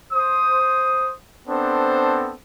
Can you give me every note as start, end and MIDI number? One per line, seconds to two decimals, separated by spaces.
0.13 1.12 72
0.13 1.12 87
1.48 2.34 59
1.48 2.34 60
1.48 2.34 62
1.48 2.34 69
1.48 2.34 72